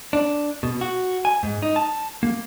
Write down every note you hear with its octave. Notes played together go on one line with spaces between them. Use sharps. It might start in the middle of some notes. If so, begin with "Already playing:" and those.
D4
B2
F#4
G#5
G#2
D#4
A5
A#3